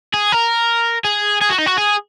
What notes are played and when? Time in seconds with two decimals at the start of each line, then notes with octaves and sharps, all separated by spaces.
0.14 G#4
0.32 A#4
1.04 G#4
1.41 G#4
1.50 F#4
1.58 D#4
1.66 F#4
1.78 G#4